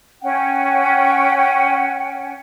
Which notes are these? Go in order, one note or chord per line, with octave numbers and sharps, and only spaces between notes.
C#4 F#5 G5